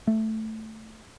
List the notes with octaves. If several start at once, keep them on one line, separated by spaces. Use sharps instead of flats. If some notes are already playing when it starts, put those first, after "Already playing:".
A3